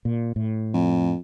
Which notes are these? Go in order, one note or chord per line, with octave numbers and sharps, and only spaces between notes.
A#2
A2
F2